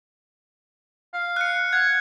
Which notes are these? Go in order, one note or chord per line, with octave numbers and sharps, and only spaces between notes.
F5
F#6 C#7
F#5 G#6